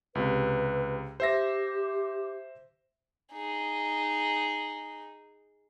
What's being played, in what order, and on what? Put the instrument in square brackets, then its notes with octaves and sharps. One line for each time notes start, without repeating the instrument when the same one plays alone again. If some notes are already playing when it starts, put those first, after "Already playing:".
[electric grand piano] C#2 C3 [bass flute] B4
[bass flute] G4 [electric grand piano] C5 E5 A#6
[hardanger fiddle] D#4 G#4